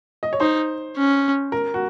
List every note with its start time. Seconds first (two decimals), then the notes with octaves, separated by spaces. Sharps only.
0.23 D#5
0.33 C#5
0.40 D#4 C5
0.97 C#4
1.52 A#4
1.74 F#4